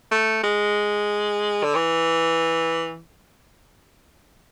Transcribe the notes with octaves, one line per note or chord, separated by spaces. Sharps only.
A3
G#3
D3
E3